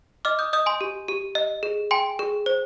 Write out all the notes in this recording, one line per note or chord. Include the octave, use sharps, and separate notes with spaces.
D#5 D6 F6
D#6 G6
D#5 D#6 G6
G#5 C6
G4
G4
D#5
G#4
G5 G#5 C6
G#4
C5